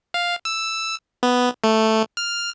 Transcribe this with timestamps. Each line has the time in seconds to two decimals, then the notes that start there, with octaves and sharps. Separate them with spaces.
0.14 F5
0.45 E6
1.23 B3
1.64 A3
2.17 F6